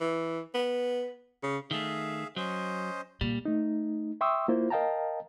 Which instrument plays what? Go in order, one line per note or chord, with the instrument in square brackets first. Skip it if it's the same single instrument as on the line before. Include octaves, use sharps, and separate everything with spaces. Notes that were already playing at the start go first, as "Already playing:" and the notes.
[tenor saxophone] E3
B3
C#3
[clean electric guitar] D#3 A3 [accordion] G#4 E5 F5
[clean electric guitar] F#3 [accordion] C#4 C5 D#5
[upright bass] A#2 [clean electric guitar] G3
[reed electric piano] A3 D#4
E5 G5 C6 C#6 D#6 E6
A#3 E4 F4 C5
A#4 D#5 F5 G5 A5 A#5